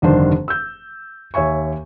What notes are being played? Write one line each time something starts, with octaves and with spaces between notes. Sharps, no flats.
F1 G2 D3 D#3 D4 C5
E6 G6
D#2 C#5 E5 G#5 C#6